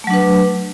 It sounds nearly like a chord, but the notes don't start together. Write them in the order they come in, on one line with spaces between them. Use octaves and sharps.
A3 F#3 D4 B4